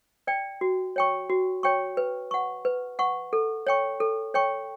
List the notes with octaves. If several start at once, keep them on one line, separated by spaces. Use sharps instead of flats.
D5 G5
F#4
C#5 G5 C#6
F#4
C#5 G5 C#6
B4
F#5 C#6
B4
F#5 C#6
A4
C#5 G5 C#6
A4
C#5 G5 C#6